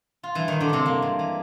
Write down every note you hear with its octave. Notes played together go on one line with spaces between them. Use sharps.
F4
G2 E3 E4
D#3 E3 D#4
D3 D4
G2 C3 C4
G#3 A#3
G2
E3